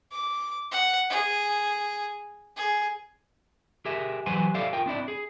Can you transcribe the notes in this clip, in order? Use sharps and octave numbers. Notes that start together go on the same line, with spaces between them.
D6
F#5
G#4
G#4
G4 G#4 A#4 E5
E3 F#3 G4 B4 C5 G#5
G4 A4 C5 D5 E5 F5
F4 A#4 G5
C4 D4 E4 D5
G#4